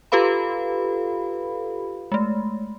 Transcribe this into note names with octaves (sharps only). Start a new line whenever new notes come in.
F4 G4 A4 B4 F5 B5
G#3 A3